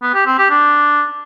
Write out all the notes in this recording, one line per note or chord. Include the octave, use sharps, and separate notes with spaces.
B3
G4
C4
G4
D4